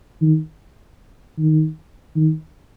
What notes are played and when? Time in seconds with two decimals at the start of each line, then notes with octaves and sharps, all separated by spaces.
0.21 D#3
1.39 D#3
2.16 D#3